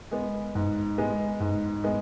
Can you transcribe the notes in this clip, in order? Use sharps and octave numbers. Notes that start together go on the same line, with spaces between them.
G#3 B3
G#2
G#3 B3
G#2
G#3 B3